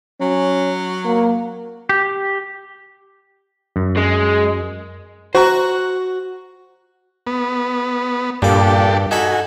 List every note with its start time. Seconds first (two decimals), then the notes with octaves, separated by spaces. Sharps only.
0.21 F#3 C#4
1.05 A#3
1.89 G4
3.76 F#2
3.97 G#3
5.35 F#4 C5 A#5
7.27 B3
8.42 G2 A#2 D4 G4 A4 D5
9.11 D#4 F#4 A4 G#5 B5